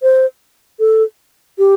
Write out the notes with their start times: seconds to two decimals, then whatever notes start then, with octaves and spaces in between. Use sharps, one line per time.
0.02 C5
0.80 A4
1.58 G4